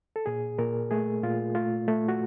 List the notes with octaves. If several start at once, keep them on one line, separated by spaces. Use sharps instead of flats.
A4
A#2 G#4
A#2 A#4
A3 G#4
A#2 F4
A3 F4
A3
F#4